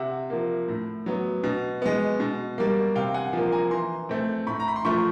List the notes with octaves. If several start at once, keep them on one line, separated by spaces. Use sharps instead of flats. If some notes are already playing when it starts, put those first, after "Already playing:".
Already playing: C3 E5 F#5
F3 A#3
A2
F#3 B3
B2
G#3 B3
B2
G3 A#3
C3 F5 G5
F#5 G#5
F3 A#3
G#5 A#5
E3 A#5 C6
A3 C4
A2 B5 C#6
A#5
B5
C6
F3 A3 B5 C#6